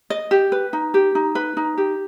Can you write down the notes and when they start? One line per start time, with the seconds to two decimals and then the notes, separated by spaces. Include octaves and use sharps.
0.10 D#5
0.31 G4
0.52 B4
0.73 D#4
0.94 G4
1.15 D#4
1.35 B4
1.57 D#4
1.77 G4